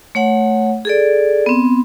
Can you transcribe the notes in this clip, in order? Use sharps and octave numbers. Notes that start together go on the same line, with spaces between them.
A3 C#5 F#5
G#4 A4 D5
B3 C4